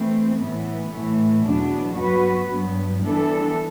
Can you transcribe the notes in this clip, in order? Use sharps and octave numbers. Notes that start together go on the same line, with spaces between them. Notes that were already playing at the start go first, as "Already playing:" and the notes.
Already playing: E3 A3 C4
A2 E3 B3
A2 E3 A3
E2 B2 F#3 B3 D4
G2 F#3 B3 F#4 B4
G2 F#3 B3
E3 G3 B3 D4 A4